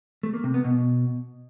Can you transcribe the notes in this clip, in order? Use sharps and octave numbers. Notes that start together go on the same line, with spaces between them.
A3
A#3
C3
B3
B2